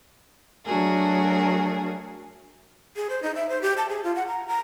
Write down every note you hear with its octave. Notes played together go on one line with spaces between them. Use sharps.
F#3 A3 D4 F#4 G#4 A#4
G#4
C5
D#4
E5
C5
G4
A5
G#4
F4
F#5
A#5
A#5